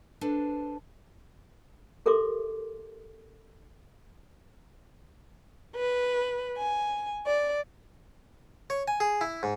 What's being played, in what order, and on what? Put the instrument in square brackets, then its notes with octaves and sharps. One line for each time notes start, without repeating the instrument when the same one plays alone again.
[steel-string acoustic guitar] D4 A4 B4 C5
[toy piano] G4 A4 A#4 E5 C6 D6
[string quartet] B4
G#5
D5
[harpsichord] C#5
G#5
G#4
E4
G#2